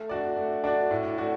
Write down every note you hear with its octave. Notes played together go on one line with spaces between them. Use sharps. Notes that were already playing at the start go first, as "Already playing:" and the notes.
Already playing: A3
D4 F#4 D5
A3
D4 F#4 D5
A2
A3 F#4 D5